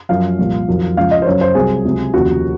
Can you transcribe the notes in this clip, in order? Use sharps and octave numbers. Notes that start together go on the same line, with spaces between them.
F#2 F3 F5
C2 A#2 F3
F2 D#3 F#3
C#2 C#3 F3 F5
D#5
C5
F#2 C#3 F#3 C#5
C5
C2 C3 F#3 G#4
C#2 C3 F#3
D#2 C#3 F3 F#4